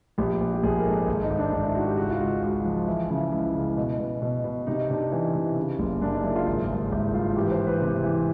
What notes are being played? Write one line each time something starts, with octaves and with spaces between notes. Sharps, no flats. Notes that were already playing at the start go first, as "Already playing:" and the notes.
A#1 G4
A#1
G4
A#1 G#4
A#4
G#2 A4
G#1 A4
D#4
G#1
D4
G#1 D#4
E4
G#2 F#4
G4
C#2 F#4
F4
C#2 F#4
C#2 F#4
F3
E3 E4
C#3 E4
C#2 E4
C#3
B2
B2
B2
B2
C3 D#4
C3 D4
E3
C3
C#3
F#1
F#2 D4
D#4
F#1 E4
F4
G#1
G2
G#1 E4
G2 F4
E3 G4
B4
C5
E3
B4
C3
E3